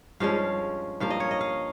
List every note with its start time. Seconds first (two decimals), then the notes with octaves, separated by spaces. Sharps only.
0.20 G2 F3 G#3 C#4 F5
1.00 G2 F3 A#3 F5
1.10 D#5
1.20 C#5
1.31 D#5
1.41 F5